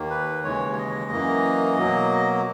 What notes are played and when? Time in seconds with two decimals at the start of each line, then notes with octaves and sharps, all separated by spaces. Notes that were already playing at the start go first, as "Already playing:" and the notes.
Already playing: D#2 D#3 A#3
0.10 B4
0.44 D#2 C#3 E3 G#3 C#5
0.73 C#5
0.78 D#5
1.11 F#2 E3 A#3
1.78 B2 F#3 A#3